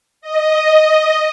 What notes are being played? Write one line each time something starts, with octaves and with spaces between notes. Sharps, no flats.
D#5